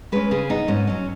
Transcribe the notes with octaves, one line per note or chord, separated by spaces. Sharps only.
G#3 C#4 B4
C#3 G#4
B3 D#4
G#2 C#4
F#3 C#4